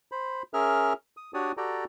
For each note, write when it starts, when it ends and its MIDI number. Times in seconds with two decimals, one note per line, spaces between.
0.12 0.43 72
0.12 0.43 83
0.54 0.93 61
0.54 0.93 68
0.54 0.93 70
0.54 0.93 76
0.54 0.93 89
1.17 1.31 87
1.34 1.52 62
1.34 1.52 66
1.34 1.52 67
1.34 1.52 73
1.34 1.52 74
1.34 1.52 87
1.57 1.85 66
1.57 1.85 67
1.57 1.85 69
1.57 1.85 74
1.57 1.85 79
1.57 1.85 82